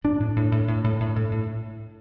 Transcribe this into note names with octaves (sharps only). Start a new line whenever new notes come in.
A2 D4
A2
A2
A2
A2
A2
A2
A2
A2